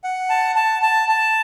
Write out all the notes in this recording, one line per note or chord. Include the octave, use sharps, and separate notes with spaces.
F#5
A5
A5
A5
A5